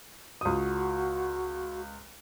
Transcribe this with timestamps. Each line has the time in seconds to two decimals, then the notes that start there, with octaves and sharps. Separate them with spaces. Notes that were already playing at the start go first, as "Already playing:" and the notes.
0.41 C#2 F#4 D#6